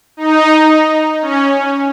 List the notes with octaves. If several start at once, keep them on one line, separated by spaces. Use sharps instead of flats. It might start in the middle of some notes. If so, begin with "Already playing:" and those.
D#4
C#4